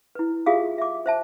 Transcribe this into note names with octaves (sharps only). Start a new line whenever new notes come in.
E4 B4
F4 G4 G#4 E5 F5 D#6
E5 D6
C5 E5 A5